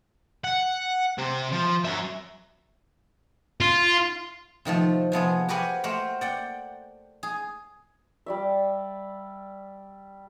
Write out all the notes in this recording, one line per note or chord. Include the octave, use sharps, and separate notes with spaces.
F#5
C3 C4
F3
F#3 E5
F4
C3 D#3 F3 A3
C3 F3 B3 G#4
F#4 G4 A#4 B4 F#5 G#5
A3 F#4 G4 A#4 C5 F#5
D5 F#5 G5
G#4
G3 D5 E5